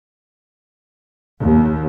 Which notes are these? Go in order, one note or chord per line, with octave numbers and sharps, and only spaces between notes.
D#2